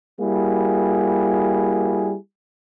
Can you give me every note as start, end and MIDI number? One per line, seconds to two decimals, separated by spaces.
0.21 2.15 55
0.21 2.15 58
0.21 2.15 64
0.21 2.15 66
0.21 2.15 68